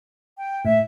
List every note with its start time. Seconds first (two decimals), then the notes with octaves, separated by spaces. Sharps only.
0.38 G5
0.65 A2 E5